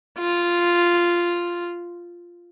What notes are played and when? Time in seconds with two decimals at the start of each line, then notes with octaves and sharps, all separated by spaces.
0.19 F4